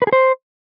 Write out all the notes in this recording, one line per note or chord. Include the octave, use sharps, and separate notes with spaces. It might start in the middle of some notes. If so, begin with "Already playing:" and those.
B4
G#4
C5